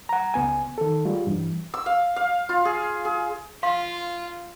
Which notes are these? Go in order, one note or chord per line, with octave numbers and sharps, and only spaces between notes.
F#5 A#5
C#2 B3 G#5
D#3 A4
G3 G#3 F4
G2 E3
E6
F5
F5
F4
G#4
G#4
F4 F5 C6